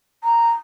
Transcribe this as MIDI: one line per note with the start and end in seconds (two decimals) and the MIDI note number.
0.23 0.49 82